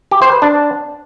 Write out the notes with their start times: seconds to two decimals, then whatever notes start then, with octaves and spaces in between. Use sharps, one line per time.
0.11 G4
0.22 C5
0.32 B4
0.42 D4